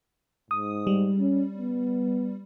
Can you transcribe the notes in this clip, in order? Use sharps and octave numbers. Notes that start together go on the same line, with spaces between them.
G#2 D#6
G3
C#4
B3